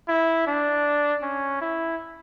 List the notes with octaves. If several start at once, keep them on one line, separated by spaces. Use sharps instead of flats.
E4
D4
C#4
E4